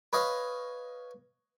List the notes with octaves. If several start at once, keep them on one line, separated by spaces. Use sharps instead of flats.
B4 C#5 D#5 F5